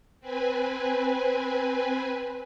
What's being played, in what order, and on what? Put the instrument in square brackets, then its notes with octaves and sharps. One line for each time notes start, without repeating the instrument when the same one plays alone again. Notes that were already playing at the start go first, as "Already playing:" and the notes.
[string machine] C4 B4 G#5